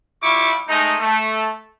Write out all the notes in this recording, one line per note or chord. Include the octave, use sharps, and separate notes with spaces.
G3 E4 F4 C#6 D6
G#3 A3 D#4
A3